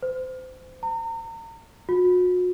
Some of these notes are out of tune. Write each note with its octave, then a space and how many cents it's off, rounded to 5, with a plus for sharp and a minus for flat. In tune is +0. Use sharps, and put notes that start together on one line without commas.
C5 -30
A#5 -35
F#4 -40